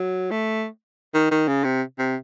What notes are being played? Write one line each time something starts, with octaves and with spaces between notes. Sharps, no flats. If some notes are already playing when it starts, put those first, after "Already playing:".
Already playing: F#3
A3
D#3
D#3
C#3
C3
C3